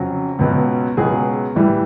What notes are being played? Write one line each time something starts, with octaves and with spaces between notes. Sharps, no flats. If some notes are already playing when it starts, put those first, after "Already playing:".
Already playing: F2 C#3 F#3
C#2 B2 F#3
C#2 B2 F#3 G#4
A2 E3 G3